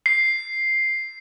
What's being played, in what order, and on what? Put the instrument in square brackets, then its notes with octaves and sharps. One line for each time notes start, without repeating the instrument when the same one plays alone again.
[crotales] C7